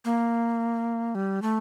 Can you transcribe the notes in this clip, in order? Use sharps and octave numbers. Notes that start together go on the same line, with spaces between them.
A#3
G3
A3